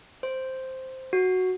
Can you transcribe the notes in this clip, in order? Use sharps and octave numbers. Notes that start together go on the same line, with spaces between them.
C5
F#4